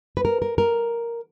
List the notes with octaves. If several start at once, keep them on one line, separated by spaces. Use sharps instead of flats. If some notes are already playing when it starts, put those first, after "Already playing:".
B4
A#4
A#4
A#4